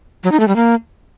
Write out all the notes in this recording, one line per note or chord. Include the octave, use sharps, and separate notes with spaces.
F#3
D#4
A3
G3
A#3